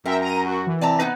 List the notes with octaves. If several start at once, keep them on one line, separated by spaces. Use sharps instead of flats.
F#2 A#4 E5 G5 A#5
A#5 A#6 D#7
F#4
E3
C3 D5 A5 A#5
B3 D#4 B4